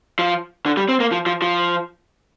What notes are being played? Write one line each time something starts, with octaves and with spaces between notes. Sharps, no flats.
F3
D3
G3
C4
A#3
F3
F3
F3